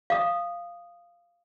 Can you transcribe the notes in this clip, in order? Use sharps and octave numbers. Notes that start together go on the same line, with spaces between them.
F5 D#6